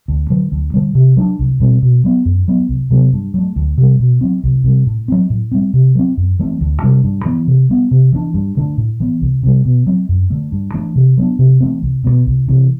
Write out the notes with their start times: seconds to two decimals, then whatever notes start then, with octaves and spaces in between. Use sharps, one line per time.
0.08 D2
0.30 D3 F#3
0.52 D2
0.74 D3 G3
0.95 C3
1.17 F#3 B3 D4
1.39 C2
1.60 B2 G3 C4
1.82 B2
2.04 F#3 B3
2.25 F#2
2.48 F#3 B3
2.69 C2
2.91 C3 F#3 B3
3.13 G2
3.34 F#3 A3
3.56 D2
3.78 C3 G3
3.99 B2
4.21 F#3 C4
4.43 C2
4.64 C3 G3
4.87 A2
5.08 F#3 C4
5.30 A2
5.52 G3 C4
5.73 C3
5.95 F#3 C4
6.17 F#2
6.39 E3 A3 C4
6.61 D2
6.82 C3 G3 D4
7.04 G2
7.26 E3 B3
7.47 C3
7.69 G3 B3
7.91 C3
8.12 E3 B3 D4
8.34 G2
8.57 D3 A3 D4
8.78 A2
9.00 E3 B3
9.21 C2
9.43 C3 G3
9.65 B2
9.87 F#3 C4
10.09 F#2
10.30 D3 A3
10.52 G2
10.74 E3 A3 D4
10.96 C3
11.17 F#3 B3 D4
11.39 C3
11.60 E3 A3 C4
11.82 C2
12.04 B2 F#3 B3
12.26 C2
12.48 C3 E3